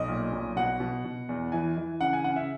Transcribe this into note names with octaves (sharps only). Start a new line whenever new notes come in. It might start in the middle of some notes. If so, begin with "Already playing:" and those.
Already playing: B1 D#5
A#2
B1
B2 F#5
B2
B2
E2
E3 G#5
E3
C#3 F#5
G#5
C#3 F#5
E5